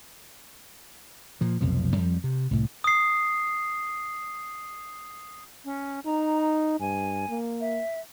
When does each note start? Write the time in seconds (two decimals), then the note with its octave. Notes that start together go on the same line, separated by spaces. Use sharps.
1.41 A#2 F3
1.61 F1 B1 F2 F3
1.96 F2 F3 G3
2.24 C3
2.51 C2 A2
2.84 D#6 C7
5.65 C#4
6.06 D#4 A#5
6.80 G2 G#5
7.29 A#3
7.61 E5